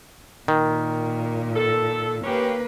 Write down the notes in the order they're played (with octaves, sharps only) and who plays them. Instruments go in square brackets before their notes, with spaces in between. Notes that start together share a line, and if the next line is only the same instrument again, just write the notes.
[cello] A#2 [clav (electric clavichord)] D#3
[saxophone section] A4
[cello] A#3 B4 [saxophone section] B3 C#4 G4